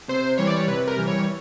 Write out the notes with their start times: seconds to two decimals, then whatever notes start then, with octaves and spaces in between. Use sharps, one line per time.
0.08 C3 C5
0.38 E3 G3 C#5
0.47 D5
0.56 C#5
0.67 C3 B4
0.87 A#4
0.97 E3 G3
1.07 C#5